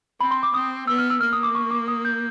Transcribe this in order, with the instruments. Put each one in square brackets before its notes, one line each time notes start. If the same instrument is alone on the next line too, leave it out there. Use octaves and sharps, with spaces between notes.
[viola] C4 [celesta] B5
[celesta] C6
D6
[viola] C4 [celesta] D#6
[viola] B3 [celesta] E6
[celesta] F6
E6
[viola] A#3 [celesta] F6
[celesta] D#6
D6
C#6
D6
D#6
G6